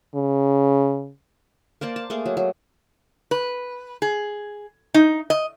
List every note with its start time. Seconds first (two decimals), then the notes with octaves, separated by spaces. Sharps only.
0.15 C#3
1.81 A#3 C5 D5 A5
1.96 A5
2.10 A3 A#3 G#4
2.26 F#3
2.37 F#3
3.31 B4
4.02 G#4
4.94 D#4
5.30 D#5